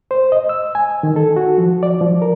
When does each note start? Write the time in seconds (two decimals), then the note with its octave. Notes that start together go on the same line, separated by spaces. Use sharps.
0.11 C5
0.32 D#5
0.49 E6
0.75 G#5
1.03 D#3
1.16 A4
1.36 F#4
1.58 F3
1.83 D5
2.01 F3
2.22 A#4